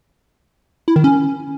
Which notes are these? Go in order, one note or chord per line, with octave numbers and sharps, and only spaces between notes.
E4
D#3
C#4